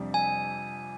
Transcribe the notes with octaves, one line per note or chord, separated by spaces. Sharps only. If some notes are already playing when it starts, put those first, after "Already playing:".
Already playing: F2 C3 G3 D4
G#5